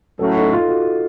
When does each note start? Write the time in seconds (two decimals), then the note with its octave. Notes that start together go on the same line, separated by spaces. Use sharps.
0.19 A2 F#3 A3 C#4 F#4 A4
0.37 D#4
0.53 F4
0.68 F#4